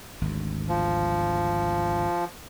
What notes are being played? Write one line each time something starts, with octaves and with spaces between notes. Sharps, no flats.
G#1 D2
F3